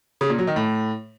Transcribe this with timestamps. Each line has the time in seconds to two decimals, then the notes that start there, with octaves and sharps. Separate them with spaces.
0.21 C#3
0.30 A#2
0.39 F#3
0.47 D#3
0.56 A2